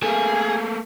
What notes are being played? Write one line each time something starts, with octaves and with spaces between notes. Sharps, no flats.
A3 A#3 G#4